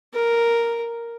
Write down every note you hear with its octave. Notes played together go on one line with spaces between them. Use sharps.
A#4